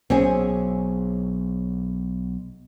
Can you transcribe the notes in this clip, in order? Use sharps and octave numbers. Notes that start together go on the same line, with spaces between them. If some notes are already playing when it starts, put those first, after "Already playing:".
B1 C4 C#4 G#4